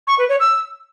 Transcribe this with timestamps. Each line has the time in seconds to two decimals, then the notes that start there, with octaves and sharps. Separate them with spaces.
0.07 C#6
0.18 B4
0.29 C#5
0.40 E6